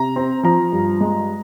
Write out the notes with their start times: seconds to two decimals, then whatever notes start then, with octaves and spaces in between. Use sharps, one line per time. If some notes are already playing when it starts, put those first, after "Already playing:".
Already playing: C3 A#5
0.16 C4
0.43 F3 A#5
0.72 G2
1.01 G#3